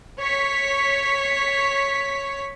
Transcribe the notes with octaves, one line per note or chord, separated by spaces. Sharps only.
C#5 B6